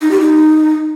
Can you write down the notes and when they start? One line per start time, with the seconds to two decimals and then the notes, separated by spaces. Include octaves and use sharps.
0.02 D#4
0.11 G4
0.21 D#4